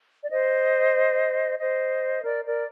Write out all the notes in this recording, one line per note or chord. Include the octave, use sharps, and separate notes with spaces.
D5
C5 D#5
C5 D#5
A#4 D5
A#4 D5